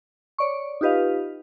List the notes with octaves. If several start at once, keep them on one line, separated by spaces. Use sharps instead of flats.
C#5 D5 C#6
D#4 F4 G4 B4 D#5 F5